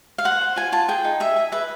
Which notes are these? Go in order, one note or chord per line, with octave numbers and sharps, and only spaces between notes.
F5
C5 F#5
C5
F4 G#5
F4 A5
G#4 G5
D#4
G#4 E5
G#4
B4 E5